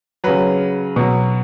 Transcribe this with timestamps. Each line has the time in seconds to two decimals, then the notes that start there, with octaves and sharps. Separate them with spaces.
0.24 C#3 F#3 B4
0.96 B2 F#3